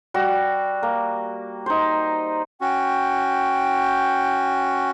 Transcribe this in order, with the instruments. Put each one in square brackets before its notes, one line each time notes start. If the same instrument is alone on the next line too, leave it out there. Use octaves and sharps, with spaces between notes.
[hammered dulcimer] G3 F#4
A#3
D#4 C5
[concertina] C#4 F#4 [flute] G5